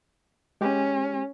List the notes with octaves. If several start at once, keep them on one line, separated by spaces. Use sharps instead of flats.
G#3 C#4 G4